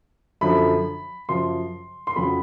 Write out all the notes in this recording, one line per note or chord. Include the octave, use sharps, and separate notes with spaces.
F#2 D3 F3 B5
F#2 C#3 F3 C6
C6
F2 C#3 F#3 B5